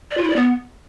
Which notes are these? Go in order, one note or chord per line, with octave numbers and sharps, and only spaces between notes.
D5
F4
E4
D5
B3